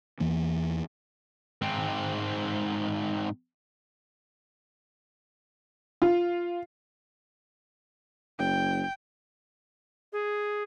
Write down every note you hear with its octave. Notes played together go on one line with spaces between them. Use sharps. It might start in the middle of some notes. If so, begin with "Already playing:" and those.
E2 E3 A#3
G#2 C4
F4
F#1 G5
G#4